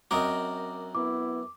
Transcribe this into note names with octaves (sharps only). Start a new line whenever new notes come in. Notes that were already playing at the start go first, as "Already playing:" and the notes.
F#2 C4 F#4 A#4 D#5 D6
B3 E4 D6